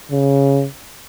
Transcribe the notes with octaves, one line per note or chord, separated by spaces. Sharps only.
C#3